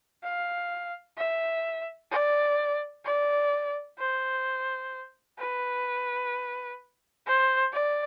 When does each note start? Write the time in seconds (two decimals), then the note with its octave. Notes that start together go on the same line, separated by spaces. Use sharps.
0.24 F5
1.18 E5
2.11 D5
3.05 D5
3.98 C5
5.39 B4
7.26 C5
7.73 D5